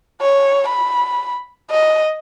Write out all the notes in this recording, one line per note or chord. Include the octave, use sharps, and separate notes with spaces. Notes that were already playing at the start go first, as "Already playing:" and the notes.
C#5
B5
D#5